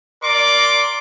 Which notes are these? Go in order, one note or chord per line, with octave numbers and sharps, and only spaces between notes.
A#4 D5 C6 D6